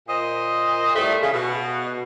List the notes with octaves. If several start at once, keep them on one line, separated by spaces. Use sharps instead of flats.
A#2 C5 D#5
A2 G3 A3
C#3
B2